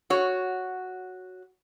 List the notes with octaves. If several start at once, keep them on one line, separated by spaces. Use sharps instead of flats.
F#4 C#5